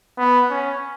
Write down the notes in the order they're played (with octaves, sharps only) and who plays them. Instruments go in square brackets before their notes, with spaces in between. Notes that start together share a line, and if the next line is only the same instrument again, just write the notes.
[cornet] B3
C#4